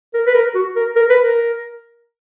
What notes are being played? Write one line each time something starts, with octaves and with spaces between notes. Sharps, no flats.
A#4
B4
A#4
F#4
A#4
A#4
B4
A#4